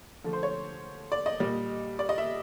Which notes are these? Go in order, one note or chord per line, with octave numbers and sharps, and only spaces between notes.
D3 F3 A3
C5
C#5
D5
D#5
A#2 G3
D5
D#5
E5